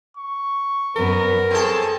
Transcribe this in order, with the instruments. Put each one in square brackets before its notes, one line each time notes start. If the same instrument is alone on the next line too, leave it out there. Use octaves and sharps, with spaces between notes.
[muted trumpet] C#6
[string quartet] F#2 B3 [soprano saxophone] A#4
[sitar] C4 A4 [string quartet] G#4